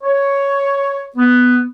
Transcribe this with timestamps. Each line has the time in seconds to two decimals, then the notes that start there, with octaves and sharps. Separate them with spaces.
0.03 C#5
1.16 B3